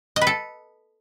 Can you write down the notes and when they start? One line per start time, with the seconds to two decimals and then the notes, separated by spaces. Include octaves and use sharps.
0.16 D#5
0.21 B4
0.27 A4